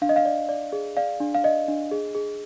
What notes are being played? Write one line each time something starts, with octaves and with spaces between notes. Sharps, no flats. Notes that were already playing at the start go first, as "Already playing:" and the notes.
D4 F5
D#5
F5
D5
D5
G#4
D5 F5
D4
F5
D5 D#5
D4
G#4
G#4